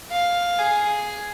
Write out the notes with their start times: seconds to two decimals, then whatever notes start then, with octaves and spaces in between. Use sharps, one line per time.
0.11 F5
0.58 G#4